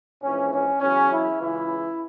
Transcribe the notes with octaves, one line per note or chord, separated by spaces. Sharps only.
A#1 G#2 E3 C#4
C#4
E2 C#3 F#3 C#4
E4
C#2 C#3 E3 E4